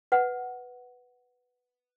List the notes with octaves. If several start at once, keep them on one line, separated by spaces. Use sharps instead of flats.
B4 F#5